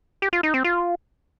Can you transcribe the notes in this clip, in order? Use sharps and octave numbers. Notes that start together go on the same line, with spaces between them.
G4
F4
D#4
C4
F4